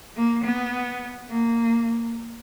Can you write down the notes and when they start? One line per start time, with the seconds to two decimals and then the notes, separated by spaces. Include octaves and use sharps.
0.16 A#3
0.44 B3
1.30 A#3